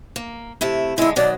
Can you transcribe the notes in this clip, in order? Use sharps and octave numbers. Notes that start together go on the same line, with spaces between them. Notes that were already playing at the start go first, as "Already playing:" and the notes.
A#3
C3 A3 E4
D3 G#3 E4
B2 D#3 F#3 D5